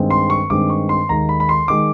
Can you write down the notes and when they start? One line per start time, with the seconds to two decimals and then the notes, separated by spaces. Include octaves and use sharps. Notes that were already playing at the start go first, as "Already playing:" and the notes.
Already playing: G2 D#3 G#3 C4
0.10 C6
0.30 C#6
0.50 G2 D#3 G#3 C4 D6
0.70 C#6
0.89 C6
1.09 D#2 D#3 G#3 A#5
1.29 B5
1.40 B5
1.49 C6
1.68 D#3 G#3 D6